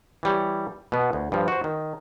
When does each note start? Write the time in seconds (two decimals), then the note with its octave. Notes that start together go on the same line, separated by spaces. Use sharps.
0.23 E3 G3 C#5
0.92 B2 B3
1.13 D2
1.32 G2 F3
1.48 F#4 C5
1.64 D#3